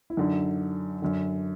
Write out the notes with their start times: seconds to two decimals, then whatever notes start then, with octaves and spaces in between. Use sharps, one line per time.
0.10 E4
0.17 F#2 D3 D#4
1.02 F#2 D3